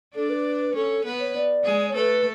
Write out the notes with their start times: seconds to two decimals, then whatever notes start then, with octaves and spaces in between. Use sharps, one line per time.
0.15 D4 A4 D5
0.30 B4
0.74 C#4 A4 C#5
1.05 B3 B4
1.20 C#5
1.36 D5
1.65 G#3 G#4
1.89 C#5
1.95 A3 A4 B4